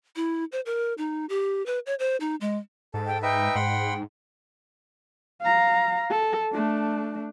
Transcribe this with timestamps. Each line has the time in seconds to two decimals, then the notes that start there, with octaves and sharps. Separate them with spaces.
0.16 E4
0.52 C5
0.66 A#4
0.98 D#4
1.29 G4
1.66 B4
1.86 C#5
1.99 C5
2.20 D#4
2.41 G#3
2.94 G#2 A4
3.07 G5
3.23 D#4 B4 E5 G5
3.55 G#2 F#5 B5 C6
5.41 F5 A#5
6.10 A4
6.52 A3 D4